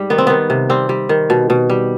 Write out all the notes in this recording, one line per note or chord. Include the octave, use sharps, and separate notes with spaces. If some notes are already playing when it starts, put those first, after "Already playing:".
Already playing: G#2 G3
D#3 B3
C4
D#3 B3
C3
G3 C4
G3
D#3
B2
B2
G3